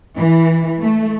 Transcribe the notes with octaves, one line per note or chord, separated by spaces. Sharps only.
E3
A3